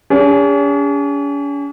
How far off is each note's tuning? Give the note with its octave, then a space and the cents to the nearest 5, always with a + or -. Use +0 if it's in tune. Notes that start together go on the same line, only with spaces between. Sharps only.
C#4 +45 G#4 -40